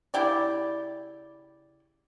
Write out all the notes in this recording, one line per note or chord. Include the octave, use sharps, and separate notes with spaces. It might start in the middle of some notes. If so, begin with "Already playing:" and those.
C#3 E4 G4 D5